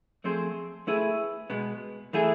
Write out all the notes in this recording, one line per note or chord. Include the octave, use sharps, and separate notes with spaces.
F3 A3 C4 G#4 C5
A3 E4 G#4 B4
B2 G#3 B3
E3 A3 E4 G#4